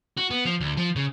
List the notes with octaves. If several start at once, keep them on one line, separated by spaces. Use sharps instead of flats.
F#4
B3
F3
D2
F3
C#3